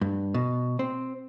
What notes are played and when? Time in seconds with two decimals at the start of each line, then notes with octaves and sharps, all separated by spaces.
0.01 G2
0.34 B2
0.79 C4